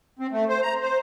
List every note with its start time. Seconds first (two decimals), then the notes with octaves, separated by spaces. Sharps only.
0.19 C4
0.31 A3
0.48 C5
0.62 A#5
0.81 C5